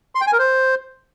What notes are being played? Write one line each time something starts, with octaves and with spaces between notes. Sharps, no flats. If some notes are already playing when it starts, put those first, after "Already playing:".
C6
G5
G#5
A#4
C5